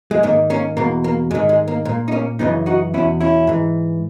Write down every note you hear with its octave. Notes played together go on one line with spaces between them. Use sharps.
G#3
G#2 D#3 A#3
A#3 C#4
E2 B2 A#3
A#3
G#2 D#3 G#3
G#3
A#3
A#2 A#3
D#4
A#3 C#4
F#2 C#3 E3 B3 D#4
D#4 F#4
E2 B2 C#4 E4
C#4 E4
G#2 E3